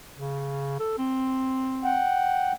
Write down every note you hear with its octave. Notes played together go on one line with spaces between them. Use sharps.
C#3
A4
C4
F#5 G5